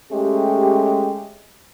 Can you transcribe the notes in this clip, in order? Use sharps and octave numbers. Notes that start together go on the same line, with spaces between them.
G#3 A3 C#4 G4